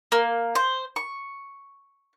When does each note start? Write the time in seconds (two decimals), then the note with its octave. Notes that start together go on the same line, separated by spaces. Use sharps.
0.12 A#3
0.55 C5
0.96 C#6